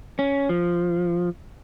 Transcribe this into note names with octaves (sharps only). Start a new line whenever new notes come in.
C#4
F3